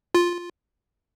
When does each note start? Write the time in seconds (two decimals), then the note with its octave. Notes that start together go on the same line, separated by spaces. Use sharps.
0.15 F4